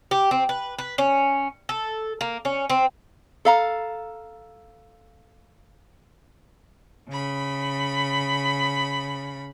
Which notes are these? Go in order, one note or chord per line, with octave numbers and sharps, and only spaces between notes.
G4
C4
B4
B4
C#4
A4
A#3
C#4
C4
A4 F5 A#5
C#3 B5